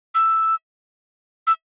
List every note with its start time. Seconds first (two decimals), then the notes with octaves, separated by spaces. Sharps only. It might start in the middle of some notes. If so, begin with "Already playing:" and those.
0.15 E6
1.47 E6